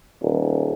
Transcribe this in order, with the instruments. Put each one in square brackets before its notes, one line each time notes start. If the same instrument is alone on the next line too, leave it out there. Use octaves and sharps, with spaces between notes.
[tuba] D#1